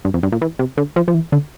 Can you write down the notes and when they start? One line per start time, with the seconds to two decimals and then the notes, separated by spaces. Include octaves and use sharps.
0.05 G2
0.14 F2
0.23 G2
0.32 A#2
0.42 E3
0.59 C3
0.78 D3
0.96 F3
1.08 F3
1.14 E3
1.32 D3